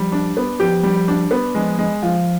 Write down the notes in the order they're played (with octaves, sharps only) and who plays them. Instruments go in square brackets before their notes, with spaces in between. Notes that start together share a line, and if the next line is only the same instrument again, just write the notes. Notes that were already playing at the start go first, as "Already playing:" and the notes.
Already playing: [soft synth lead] F3 [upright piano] G3
[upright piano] D4
B3
[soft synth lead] F3 [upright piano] G4
[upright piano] G3
D4
B3
[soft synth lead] F3 [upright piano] G#3
[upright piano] G#3
[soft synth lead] F3 [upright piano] F4